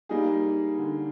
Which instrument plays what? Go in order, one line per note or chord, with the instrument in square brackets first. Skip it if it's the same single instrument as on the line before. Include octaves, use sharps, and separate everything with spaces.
[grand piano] G3 [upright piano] A#3 D#4 G#4
[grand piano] D3